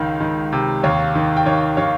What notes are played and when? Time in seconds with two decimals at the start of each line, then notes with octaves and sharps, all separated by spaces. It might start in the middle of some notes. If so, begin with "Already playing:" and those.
Already playing: C#2 D#3 F5
0.20 D#3
0.52 C3
0.83 D#2 C#5 F5
1.15 D#3
1.37 G5
1.46 D#3 C#5 F5
1.77 D#3 C#5 F5